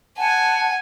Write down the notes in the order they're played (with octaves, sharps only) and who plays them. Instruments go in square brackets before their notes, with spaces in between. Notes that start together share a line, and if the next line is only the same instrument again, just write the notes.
[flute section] F#5 A5 [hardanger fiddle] G#5